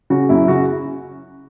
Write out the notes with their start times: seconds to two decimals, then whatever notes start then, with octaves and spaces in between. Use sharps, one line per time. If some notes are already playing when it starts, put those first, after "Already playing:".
0.10 C#3 F#4
0.29 F#2 E4
0.48 C#3 F#4